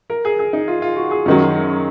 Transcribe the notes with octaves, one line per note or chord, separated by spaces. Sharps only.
A#4
G#4
G#4
D#4
F4
F4
F#4
G#4
F#2 D#3 F#3